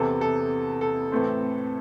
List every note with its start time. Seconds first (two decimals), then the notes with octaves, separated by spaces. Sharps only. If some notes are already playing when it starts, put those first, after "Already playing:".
Already playing: E2 C3 E3 A4
0.21 A4
0.81 A4
1.12 A2 E3 A3 C4